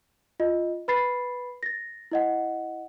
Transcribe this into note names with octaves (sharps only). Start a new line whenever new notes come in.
F4 D#5
B4 B5 A6 C7
A6 A#6
E4 D#5 F#5